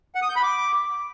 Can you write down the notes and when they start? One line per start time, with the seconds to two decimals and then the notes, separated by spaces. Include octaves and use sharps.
0.15 F#5
0.22 D#6
0.29 G6
0.36 B5
0.43 D6